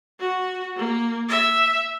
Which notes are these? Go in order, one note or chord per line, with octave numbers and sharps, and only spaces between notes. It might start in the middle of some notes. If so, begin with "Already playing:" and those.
F#4
A#3
E5